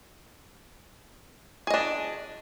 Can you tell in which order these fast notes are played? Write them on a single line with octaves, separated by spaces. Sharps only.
G#4 D#5 D4